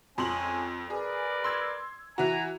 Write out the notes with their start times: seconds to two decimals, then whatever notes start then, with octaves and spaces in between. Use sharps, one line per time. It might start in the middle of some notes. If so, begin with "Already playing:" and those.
0.18 F2 G#3 C#4 G#5 C6 F#7
0.90 G#4 A#4 B4 D5
1.44 C6 E6 G#6
2.18 E3 F#4 G#5 A#5